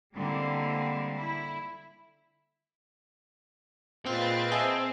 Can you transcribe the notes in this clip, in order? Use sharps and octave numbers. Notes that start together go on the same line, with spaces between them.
D3 G3 G#3 A#3 C4 E4
E4
A#2 G#3 A#3 C4 F4 B4 F5 A6
G#4 D#5 E5 A5